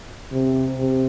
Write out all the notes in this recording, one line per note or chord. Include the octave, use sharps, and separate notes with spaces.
C3
C3